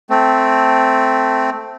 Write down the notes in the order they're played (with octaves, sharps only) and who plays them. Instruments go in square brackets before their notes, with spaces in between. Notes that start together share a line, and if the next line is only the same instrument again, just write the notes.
[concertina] A3 C4